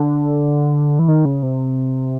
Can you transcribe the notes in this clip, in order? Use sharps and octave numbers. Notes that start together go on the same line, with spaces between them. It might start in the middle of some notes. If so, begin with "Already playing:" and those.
Already playing: D3
E3
D#3
C#3
C3